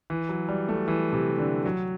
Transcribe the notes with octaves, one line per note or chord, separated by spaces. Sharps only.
E3
F#3
G3
A3
E3
C3
D3
F#3